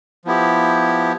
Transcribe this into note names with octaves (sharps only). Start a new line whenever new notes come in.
F3 B3 E4 G4